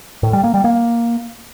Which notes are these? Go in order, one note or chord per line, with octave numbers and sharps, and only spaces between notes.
A2
G3
A#3
G3
A#3